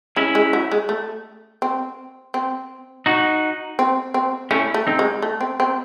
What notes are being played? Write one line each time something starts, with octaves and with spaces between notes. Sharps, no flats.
G#3 C#4 E4
G#3
F#3
G#3
A3
C4
C4
D#4 F#4
C4
C4
A3 C#4 E4
A3
C4 D#4
G#3
A3
C4
C4